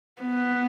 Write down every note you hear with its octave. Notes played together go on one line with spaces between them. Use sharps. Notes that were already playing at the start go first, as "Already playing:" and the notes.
B3